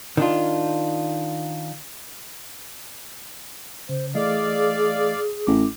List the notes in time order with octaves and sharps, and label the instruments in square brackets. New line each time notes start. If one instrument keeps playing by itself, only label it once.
[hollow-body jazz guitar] D#3 D4 F4
[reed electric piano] C#3 [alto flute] C5
[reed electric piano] E3 A3 D#5 [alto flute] G#4 [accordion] D5 F5
[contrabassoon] A1 [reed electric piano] D6